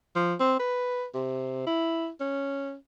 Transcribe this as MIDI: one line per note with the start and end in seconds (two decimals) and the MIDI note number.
0.16 0.34 53
0.40 0.59 60
0.60 1.05 71
1.14 1.62 48
1.67 2.09 64
2.20 2.75 61